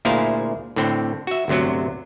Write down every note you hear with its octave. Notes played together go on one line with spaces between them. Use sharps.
D2 A#2 E4 G#4 C5 F5
A2 D3 C4
F#4 E5
G1 D2 C3 F#3